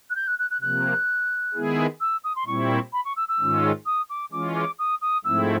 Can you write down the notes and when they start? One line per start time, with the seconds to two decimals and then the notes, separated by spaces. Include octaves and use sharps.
0.10 F#6
0.15 G6
0.27 F#6
0.39 F#6
0.50 F#6
0.61 C3 F3 A#3 F#6
1.53 D#3 G#3 B3 E4 G#4
2.00 E6
2.24 D#6
2.35 C6
2.46 A#2 G3 C4 E4 C#6
2.92 B5
3.04 C#6
3.16 E6
3.28 E6
3.39 G#2 D#3 G#3 C#4 F4
3.85 D#6
4.09 D6
4.31 E3 G#3 C#4 F4 D6
4.55 D6
4.79 D#6
5.01 D#6
5.24 G#2 F3 A3 C4 E4 E6